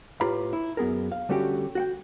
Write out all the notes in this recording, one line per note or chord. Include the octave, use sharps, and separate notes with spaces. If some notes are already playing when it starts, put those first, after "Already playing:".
A2 F4 G4 B4 A#5 B5
E4
F#2 B3 G#4 A#4
F5
D3 G3 A3 C#4 F#4 G4
F#4 F#5 G5